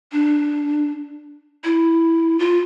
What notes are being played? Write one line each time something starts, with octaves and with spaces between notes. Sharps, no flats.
D4
E4
F4